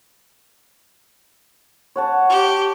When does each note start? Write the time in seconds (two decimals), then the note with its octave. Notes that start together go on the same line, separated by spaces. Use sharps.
1.96 C#5 F#5 A5
2.29 G4